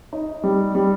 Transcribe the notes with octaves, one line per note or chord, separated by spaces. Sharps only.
D#4
G3
G3